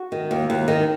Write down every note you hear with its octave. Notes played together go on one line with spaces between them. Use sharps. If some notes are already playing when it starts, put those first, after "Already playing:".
Already playing: F#4
D#3
D#2
D#2
D#3